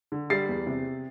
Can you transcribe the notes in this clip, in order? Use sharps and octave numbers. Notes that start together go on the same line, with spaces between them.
D3
G3 A6 C7
E2
C3